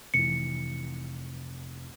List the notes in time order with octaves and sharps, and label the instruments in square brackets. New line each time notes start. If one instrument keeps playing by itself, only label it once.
[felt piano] F1 E3 [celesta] C#7